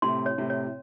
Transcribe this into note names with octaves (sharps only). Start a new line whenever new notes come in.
A2 C3 C6
C#5
A2 C3
C#5